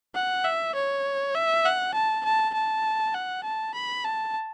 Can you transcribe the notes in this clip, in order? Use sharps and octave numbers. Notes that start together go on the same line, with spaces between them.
F#5
E5
C#5
E5
F#5
A5
A5
A5
F#5
A5
B5
A5